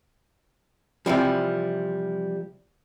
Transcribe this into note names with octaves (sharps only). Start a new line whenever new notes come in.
C3 E3 F3 G3